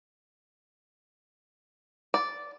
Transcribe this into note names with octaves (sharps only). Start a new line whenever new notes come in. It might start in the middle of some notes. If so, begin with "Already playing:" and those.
D5